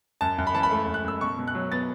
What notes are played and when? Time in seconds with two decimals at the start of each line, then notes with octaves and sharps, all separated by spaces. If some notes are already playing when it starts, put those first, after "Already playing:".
0.21 F#2 A5
0.38 F#2
0.47 B5
0.54 E3 A5
0.63 B5
0.71 A3
0.88 F#2
0.94 F#6
1.04 F#2 E6
1.21 B2 C#6
1.39 B2
1.48 F#6
1.55 F#3
1.72 B3 A6